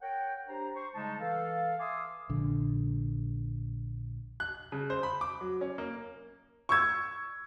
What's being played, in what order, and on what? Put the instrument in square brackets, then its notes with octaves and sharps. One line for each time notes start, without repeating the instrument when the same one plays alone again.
[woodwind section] A#4 C#5 F#5 G5
D4 G4 C5 A#5
C5 C#6
C#3 G3 G#3 D#4 A5
E3 A4 F5
E5 F5 G#5 C6 D6 D#6
[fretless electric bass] A#1 D3
[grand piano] F#6
C#3
C5
B5
D6
F#3
C#4
A#3
[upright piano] C#6 E6 G#6